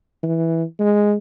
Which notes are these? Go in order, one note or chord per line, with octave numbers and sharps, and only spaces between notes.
E3
G#3